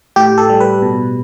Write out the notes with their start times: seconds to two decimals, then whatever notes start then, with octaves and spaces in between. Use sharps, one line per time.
0.16 A2 G4
0.38 A4
0.49 G3
0.60 B4
0.82 B2